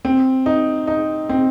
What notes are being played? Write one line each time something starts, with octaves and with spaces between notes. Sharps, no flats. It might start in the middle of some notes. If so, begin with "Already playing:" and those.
C4
D#4
D#4
C4